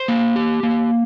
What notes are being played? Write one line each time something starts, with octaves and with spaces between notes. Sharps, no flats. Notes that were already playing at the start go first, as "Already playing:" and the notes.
Already playing: C5
A#3
G4
A#3